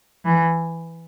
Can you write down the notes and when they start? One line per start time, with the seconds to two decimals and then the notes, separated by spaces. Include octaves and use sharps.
0.25 E3